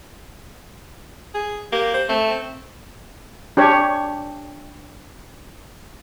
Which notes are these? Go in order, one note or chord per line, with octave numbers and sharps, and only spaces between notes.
G#4
A#3 G4
C5
A3 C4
C4
D4 G4 C#5